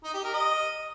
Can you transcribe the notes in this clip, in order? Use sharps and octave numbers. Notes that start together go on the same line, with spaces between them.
D#4
G4
A#4
D#5